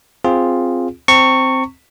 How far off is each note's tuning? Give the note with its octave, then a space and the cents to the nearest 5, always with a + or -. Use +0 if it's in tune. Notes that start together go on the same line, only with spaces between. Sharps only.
C4 +0 F4 +0 G#4 +0
C4 +0 A#5 -45 C#6 +0